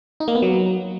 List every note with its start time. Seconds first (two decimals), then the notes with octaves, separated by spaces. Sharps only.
0.20 D#4
0.28 A#3
0.35 B3
0.42 F#3